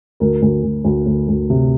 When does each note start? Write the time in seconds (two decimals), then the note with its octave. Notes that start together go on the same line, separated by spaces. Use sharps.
0.20 D2 A#4
0.42 D2
0.64 D2
0.84 D2
1.06 D2
1.28 D2
1.50 C3